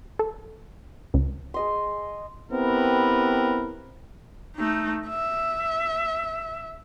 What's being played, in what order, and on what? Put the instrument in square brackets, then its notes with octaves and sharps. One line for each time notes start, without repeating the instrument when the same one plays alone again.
[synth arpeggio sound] A4
C#2
[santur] G#4 D#5 C6
[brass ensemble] B3 C4 E4 G4 A#4 B4
[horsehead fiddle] A3 D#4
E5